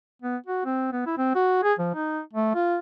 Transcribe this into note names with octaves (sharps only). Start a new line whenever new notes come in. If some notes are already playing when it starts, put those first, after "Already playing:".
B3
F#4
C4
B3
E4
C4
F#4
G#4
F3
D#4
A3
F4